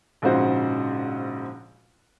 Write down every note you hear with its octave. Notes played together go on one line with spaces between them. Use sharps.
A#1 G#2 C#3 F#4 C5